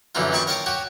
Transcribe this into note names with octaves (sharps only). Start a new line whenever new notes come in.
F#2 A#2 D3 E3 D#4 F4
A#2 D#3 D5 B5 C#6 D6
A#4 C#5 F5 G5 A5
F#4 G4 C#5